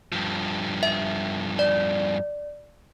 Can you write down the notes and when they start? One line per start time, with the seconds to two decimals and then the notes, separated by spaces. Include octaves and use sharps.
0.12 G2 F3
0.83 E5
1.59 D5